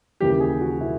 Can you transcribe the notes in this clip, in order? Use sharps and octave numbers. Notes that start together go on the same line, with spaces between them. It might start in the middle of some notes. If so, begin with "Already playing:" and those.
D#2 C#3 E3 G4
G#4
F#4
C#3 E3 E4